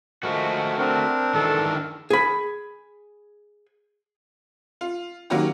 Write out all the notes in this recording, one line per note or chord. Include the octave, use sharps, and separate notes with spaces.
F3 G#3 A3 F#4 A#4
C4 D4 A#4
D#3 E3 G#3 A4
G#4 B5
F4
D#3 F#3 A#3 C#4 F#4 G4